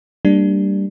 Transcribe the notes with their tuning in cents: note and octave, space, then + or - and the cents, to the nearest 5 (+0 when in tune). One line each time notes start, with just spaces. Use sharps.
G3 +0 A#3 -30 D4 +5